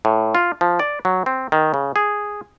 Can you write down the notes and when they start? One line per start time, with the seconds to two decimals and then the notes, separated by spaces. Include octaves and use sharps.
0.05 A2
0.35 F4
0.61 F3
0.79 D5
1.05 F#3
1.26 C4
1.52 D#3
1.74 C#3
1.96 G#4